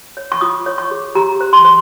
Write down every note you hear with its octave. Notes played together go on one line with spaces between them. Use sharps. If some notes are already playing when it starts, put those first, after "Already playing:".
C#5
C#6
F4 D#6
C#5
C#6
G#4
G4 A#5
C5
C6
C5